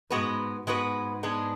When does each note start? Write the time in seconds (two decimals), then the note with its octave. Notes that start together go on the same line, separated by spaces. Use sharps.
0.10 G#2 G#3 B3 F#4 B4
0.66 G#2 G#3 B3 F#4 B4
1.23 G#3 B3 D4 G#4